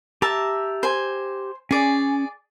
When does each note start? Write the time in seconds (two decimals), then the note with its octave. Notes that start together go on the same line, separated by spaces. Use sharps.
0.22 G4 E5 A5 A#5 E6
0.83 C5 G#5
1.71 C#4 G#4 D5